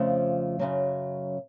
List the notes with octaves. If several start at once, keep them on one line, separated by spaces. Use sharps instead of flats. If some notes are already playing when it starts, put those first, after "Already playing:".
Already playing: F2 C#3 F3 A3
F#2 C#3 F#3